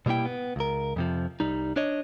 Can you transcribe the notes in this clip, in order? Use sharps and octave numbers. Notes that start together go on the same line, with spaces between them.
B2 G3 A#3 E4 G5
B3
C#2 A#4
F2 C3 F3
C2 G3 D#4
D4 C#5 D#5